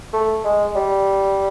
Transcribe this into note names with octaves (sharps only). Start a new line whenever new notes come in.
A3
G#3
G3